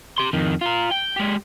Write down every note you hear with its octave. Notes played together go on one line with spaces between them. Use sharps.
G4 C6
F2 D#3
F4 A#4
G5
G#3 G4